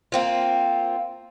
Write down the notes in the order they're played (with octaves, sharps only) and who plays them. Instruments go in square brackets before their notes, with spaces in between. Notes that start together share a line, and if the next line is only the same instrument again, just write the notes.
[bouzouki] A#3 C4 F4